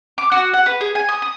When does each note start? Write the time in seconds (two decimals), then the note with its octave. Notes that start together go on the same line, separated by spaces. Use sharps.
0.18 D6
0.32 F#4
0.54 F#5
0.66 B4
0.81 G#4
0.95 G#5
1.09 D#6
1.22 D#6